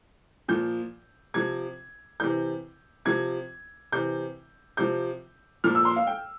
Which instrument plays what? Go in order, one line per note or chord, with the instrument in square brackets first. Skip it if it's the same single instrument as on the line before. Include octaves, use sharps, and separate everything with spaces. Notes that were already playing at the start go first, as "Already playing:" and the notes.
[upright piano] A#2 F3 G6
C3 F3 G#6
C3 E3 G6
C3 F3 G#6
C3 E3 G6
C3 F3 G6
A#2 F3 F6
E6
C6
F5
G5